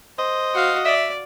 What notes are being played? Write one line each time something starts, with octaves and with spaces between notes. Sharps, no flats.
C5 D#5
F#4 F5
D5 E5